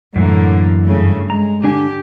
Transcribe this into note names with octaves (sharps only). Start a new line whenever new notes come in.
F#2 A2 D3 E3 A#3
G2 C#3 A3
G#3 A#5
D3 D4 G4 G#5